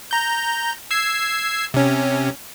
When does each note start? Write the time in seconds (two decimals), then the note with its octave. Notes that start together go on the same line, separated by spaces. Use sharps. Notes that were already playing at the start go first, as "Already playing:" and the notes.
0.11 A#5 G6
0.91 E6 G#6 C7
1.74 C3 C#4